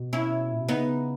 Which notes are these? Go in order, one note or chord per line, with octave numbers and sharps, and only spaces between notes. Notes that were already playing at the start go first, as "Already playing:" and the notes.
Already playing: B2
C#4 E4
A#2
B2
C#3 B3 D#4